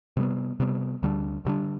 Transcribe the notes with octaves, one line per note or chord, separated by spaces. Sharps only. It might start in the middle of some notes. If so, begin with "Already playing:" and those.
C3 G3 B3
C3 G3 B3
D2 D3 G3 D4
D2 D3 G3 D4